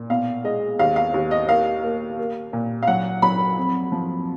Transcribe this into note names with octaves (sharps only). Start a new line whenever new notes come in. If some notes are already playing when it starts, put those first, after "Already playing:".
Already playing: A#2
B2 F5
G#3 D#5
D#2 F5
F5
D#2
D#5
A#3 F5
A#3
A#3
A#2
F5
F#3 F#5
F#3 B5
F2
F3